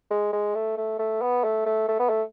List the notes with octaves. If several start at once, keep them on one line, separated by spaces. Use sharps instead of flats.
G#3
G#3
A3
A3
A3
B3
A3
A3
A3
B3
A3